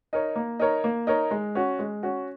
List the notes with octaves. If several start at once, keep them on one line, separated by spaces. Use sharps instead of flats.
D#4 A#4 C#5
A#3
D#4 A#4 C#5
A#3
D#4 A#4 C#5
G#3
C#4 F#4
G#3
C#4 F#4